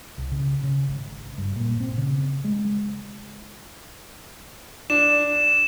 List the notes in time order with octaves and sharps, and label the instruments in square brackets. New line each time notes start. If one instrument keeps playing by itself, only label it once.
[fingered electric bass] C2
C#3
C#3
G#1
G2
A#2
C4
C#3
G#3
[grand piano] D4 [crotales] E7